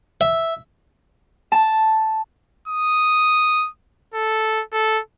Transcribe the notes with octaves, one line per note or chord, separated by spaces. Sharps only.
E5
A5
D#6
A4
A4